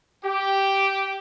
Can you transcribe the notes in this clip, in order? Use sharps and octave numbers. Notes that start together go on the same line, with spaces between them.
G4